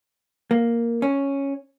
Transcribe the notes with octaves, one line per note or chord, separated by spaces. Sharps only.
A#3
C#4